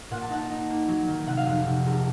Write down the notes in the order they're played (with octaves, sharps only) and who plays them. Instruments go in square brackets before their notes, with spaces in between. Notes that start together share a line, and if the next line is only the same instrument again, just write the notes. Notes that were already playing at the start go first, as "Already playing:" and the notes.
[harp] A#2 F#5
A5
D#4 F#5
D#4
A#3
F#3
D#3
C3 F#5
F5
F1 F#5
C3
A#1